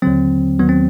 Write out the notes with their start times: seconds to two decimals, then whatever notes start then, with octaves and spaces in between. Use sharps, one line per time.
0.02 D#2 D3 F#3 C4
0.59 D#2 D#3 F#3 B3
0.69 C4